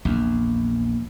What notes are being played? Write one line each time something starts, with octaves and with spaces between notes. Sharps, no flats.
A#1 E2